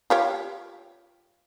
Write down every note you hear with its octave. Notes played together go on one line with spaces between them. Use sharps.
F4 G4 C#5